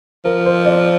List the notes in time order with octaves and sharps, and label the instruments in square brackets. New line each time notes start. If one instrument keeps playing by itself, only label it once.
[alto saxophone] F3 [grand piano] A#4
[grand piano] C5
D5